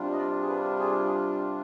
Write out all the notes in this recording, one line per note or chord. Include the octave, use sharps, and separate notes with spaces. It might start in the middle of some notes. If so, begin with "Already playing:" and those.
Already playing: C3 G3 D4 F4
D#5
D5
G#4
B4
G#4
G#4